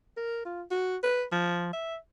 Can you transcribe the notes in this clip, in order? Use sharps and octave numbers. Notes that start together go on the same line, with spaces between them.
A#4
F4
F#4
B4
F3
E5